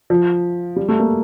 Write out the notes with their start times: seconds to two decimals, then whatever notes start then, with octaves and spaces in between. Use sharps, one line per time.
0.10 F3
0.76 G3
0.89 A3
1.00 A#3